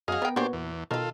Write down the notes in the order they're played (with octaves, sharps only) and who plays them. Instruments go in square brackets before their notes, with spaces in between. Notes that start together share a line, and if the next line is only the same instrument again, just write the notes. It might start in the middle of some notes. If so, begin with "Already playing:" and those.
[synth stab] F#2 [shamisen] B3 F#4 [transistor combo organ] G#4 D#5 F5
[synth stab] B3 [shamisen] A#4 G5
[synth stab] A#2 B3 [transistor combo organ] D4 G4 C5 [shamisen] F#4 C#5
[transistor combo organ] E2
[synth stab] B2 D#3 [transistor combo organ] F4 A4 [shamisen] A#4 F5